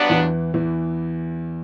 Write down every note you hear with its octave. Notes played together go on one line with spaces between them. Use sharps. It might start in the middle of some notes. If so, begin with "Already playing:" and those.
Already playing: G2 F#3 B3 D4
E2 E3
E2 E3